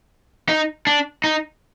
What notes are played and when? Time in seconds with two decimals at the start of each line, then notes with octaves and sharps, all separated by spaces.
0.49 D#4
0.87 D4
1.24 D#4